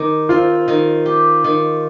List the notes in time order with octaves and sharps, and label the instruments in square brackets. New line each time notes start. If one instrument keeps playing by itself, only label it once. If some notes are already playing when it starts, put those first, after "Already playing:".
Already playing: [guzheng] D#3 G4
[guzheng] C4 [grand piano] F4
[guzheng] D#3
G4
D#3